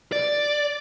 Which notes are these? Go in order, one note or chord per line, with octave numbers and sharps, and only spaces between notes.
D5